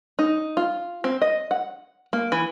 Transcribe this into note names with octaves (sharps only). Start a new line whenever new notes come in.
D#4
F4
C4
D#5
F#5
A#3
E3